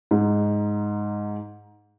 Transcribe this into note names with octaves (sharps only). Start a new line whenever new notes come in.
G#2 D#4